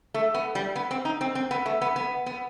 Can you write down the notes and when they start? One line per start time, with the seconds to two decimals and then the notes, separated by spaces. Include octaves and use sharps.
0.14 A3
0.34 B3
0.55 G3
0.76 B3
0.91 C4
1.05 D#4
1.21 C4
1.35 C4
1.51 B3
1.66 A3
1.81 B3
1.96 B3
2.26 B3